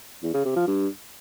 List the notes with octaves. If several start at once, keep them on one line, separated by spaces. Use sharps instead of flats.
E2
C#3
C3
F3
G2